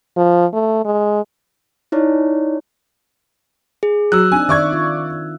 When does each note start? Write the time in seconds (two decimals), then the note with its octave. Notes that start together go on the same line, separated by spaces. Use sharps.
0.17 F3
0.54 A3
0.85 G#3
1.92 D#4 E4 C#5 D5
3.83 G#4
4.12 F#3 E6 F#6
4.32 C4 D4 D#4 G#5
4.49 D#3 D5 E5 C#6 G#6
4.73 F4